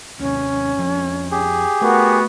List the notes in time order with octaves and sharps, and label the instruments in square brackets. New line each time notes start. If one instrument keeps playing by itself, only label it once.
[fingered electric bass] D#2 C3 [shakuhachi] C#4
[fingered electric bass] F2 F3 D4
[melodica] G4 G#4
[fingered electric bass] A3 [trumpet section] B3 F#4 [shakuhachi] A#4